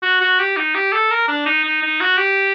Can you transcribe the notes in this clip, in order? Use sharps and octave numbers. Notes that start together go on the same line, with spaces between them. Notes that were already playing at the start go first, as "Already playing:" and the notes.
F#4
F#4
G4
D#4
G4
A4
A#4
D4
D#4
D#4
D#4
F#4
G4